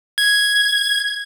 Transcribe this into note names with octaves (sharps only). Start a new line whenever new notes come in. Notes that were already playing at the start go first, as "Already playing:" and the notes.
G#6